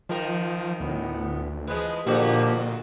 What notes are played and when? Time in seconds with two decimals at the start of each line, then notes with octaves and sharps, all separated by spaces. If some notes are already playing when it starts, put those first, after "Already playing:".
0.09 D#3 F3 A#4
0.80 D2 A2 B3
1.68 E3 F3 G#3 B4
2.07 A#2 D3 F3 A#3 F#4 G4